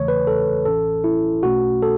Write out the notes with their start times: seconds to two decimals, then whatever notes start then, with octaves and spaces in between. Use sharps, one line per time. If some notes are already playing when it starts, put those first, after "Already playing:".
Already playing: E2 C#3 E3 A3 C#5
0.08 B4
0.27 A4
0.65 A1 A2 E3 C#4 A4
1.04 E4
1.43 B1 B2 A3 C#4 F#4
1.82 A4